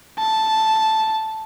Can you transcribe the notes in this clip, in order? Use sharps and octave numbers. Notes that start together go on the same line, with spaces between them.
A5